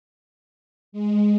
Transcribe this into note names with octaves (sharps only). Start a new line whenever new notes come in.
G#3